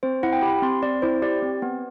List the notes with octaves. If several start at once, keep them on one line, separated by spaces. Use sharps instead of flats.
C4 C5
E4 F#5
G5
G4 B5
C4 C6
C4 D5
E4 C5
G4 D5
C4
B3